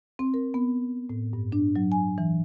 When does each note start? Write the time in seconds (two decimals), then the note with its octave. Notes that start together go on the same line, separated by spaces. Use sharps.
0.19 C4
0.34 A#4
0.54 B3
1.09 A2
1.33 G2
1.52 D4
1.76 F#3
1.92 G#5
2.18 E3